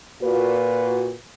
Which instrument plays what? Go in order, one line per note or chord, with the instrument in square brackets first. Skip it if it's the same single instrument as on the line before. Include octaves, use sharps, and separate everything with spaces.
[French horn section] A#2 F#4 B4